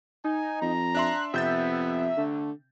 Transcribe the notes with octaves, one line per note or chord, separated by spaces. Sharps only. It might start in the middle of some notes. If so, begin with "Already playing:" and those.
D#4 G#5
F2 A#5
D4 E5 C6 F#6
F2 C3 B3 E5 G6 A6
D3 A3